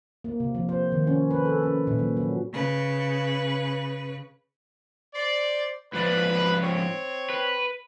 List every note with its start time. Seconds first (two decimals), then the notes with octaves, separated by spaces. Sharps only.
0.24 A#3
0.40 C3
0.55 F3
0.69 C5
0.92 D#3
1.07 C#4
1.31 B4
1.45 A4
1.63 C#4
1.87 A#2
1.99 F#3
2.17 F#3
2.52 C#3 B4
5.15 C5 D5
5.93 G#2 F3 B4 D5
6.63 C4 C#5
7.30 B4